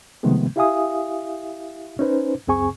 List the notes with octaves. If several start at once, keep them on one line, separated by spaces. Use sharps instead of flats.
C3 D#3 F3 G#3 A3 B3
E4 G4 E5 F5 G#5 D#6
C#4 D#4 B4 C5
C#2 F#2 C4 G#4 G#5 C#6